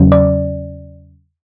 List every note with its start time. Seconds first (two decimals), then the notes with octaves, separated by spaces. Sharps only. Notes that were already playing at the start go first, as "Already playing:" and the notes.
Already playing: E2 C#3 F#3 C#4
0.12 D5